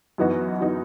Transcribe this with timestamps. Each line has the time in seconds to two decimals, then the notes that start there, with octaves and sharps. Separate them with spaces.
0.18 F#2 E3 B3 D#4 F#4
0.61 E3 B3 D#4 F#4